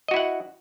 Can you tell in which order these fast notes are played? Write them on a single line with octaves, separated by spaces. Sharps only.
D#5 F#4 E4 F#5